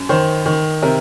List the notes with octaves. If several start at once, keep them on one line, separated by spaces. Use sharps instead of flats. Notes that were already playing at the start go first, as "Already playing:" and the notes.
Already playing: F#2
D#3 C5
D#3
C3 A#4